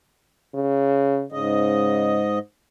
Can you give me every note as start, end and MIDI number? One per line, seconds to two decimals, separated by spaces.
0.54 1.24 49
1.32 2.39 44
1.32 2.24 49
1.32 2.39 75